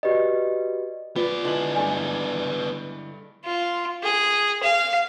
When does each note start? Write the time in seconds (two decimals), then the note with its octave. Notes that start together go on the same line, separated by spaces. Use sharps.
0.03 F#4 G4 B4 D5 D#5
1.16 B3 F4 B4 D5 G7
1.45 D3 G#3 D4 E4 G#5 F#7
1.76 G2 A3 D4 G#5
3.45 F4
4.03 G#4
4.63 F5